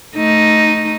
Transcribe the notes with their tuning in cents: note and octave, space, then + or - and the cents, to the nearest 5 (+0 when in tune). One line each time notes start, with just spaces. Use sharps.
A3 +5 D#4 +0